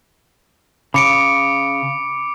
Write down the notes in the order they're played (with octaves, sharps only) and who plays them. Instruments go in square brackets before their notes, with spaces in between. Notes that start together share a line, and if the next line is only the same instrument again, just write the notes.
[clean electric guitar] C#3 [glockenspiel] B5 C#7 D7 [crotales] D6